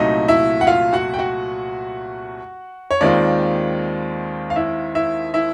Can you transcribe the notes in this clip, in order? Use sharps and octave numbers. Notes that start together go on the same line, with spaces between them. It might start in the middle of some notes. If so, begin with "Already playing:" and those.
Already playing: C2 A#2 F#3 A3 D#4 D#5
E4 E5
F#5
F4 F5
F#4 F#5
G5
F#4 F#5
C#5
D#2 D#3 G#3 C4 F4 D5
F5
E4 E5
E4 E5
E4 E5